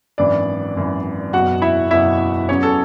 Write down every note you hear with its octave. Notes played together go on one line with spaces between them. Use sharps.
G#1 F#2 E3 D4 D5
G#1 F#2 E3
F#1 E2 B2 F#3 F#4 F#5
E4 E5
F#1 E2 B2 F#3 E4 E5
E2 C#3 F#3 C#4 C#5
A4